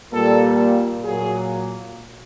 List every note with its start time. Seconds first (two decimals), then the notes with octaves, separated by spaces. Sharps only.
0.13 A#2 G3 A#3 A4
1.03 A#2 F#3 A#3 G#4